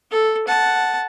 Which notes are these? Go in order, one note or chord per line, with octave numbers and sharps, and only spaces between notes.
A4
F#5 A5